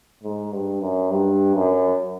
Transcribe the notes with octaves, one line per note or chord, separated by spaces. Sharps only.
G#2
G2
F#2
G2
F#2